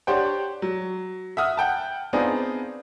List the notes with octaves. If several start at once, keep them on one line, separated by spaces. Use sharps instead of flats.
D4 G4 C5 C#5 F#5 G5
F#3
E5 F#5 D#6 F6
F#5 G5 A5
B3 C4 D4 D#4 F4 G#4